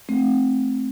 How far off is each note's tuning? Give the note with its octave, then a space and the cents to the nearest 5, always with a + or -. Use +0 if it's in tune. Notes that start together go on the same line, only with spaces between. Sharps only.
A3 -15 C4 +0